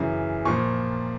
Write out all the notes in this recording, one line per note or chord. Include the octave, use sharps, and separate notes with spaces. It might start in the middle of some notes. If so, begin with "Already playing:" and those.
Already playing: F#2 C#3 E3
A#2 F3 C#6